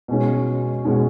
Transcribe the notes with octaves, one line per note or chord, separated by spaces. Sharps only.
B2 G#3 C#4
B2 G#3 C#4